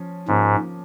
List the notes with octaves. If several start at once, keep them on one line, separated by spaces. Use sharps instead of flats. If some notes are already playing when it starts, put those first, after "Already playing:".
Already playing: F3 C#4
G#2 F3 A#3 C#4